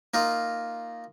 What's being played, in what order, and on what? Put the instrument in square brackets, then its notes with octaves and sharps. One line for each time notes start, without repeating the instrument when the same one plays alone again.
[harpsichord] A#3 D#4 F4